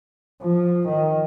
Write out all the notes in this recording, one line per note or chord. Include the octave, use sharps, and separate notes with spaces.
F3
D#3